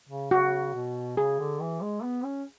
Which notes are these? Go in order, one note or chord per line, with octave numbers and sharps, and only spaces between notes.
C#3
C#3 F#4
B2
C#3 G#4
D3
E3
G#3
B3
C#4